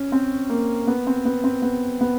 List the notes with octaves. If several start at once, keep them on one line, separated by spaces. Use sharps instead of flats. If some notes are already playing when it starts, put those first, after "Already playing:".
Already playing: C#4
C4
A#3
B3
C4
B3
C4
B3
B3